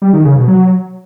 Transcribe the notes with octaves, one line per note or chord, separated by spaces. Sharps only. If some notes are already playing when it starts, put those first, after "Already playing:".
G3
D#3
C#3
B2
F#3